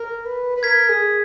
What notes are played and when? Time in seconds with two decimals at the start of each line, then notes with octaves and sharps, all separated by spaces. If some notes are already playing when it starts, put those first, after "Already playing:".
Already playing: A#4
0.25 B4
0.56 B4
0.63 A#4 G#6 B6
0.89 G#4